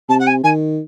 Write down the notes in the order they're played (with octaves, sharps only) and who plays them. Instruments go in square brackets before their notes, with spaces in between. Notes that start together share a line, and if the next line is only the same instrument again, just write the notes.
[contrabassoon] C3 [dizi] A5
[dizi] F#5
G#5
[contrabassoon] D#3 [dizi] G#5